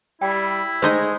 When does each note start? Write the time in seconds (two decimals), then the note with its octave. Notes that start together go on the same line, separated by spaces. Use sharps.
0.22 G3 E4 G5
0.82 G#3 A3 D#4 C5 D#5 C6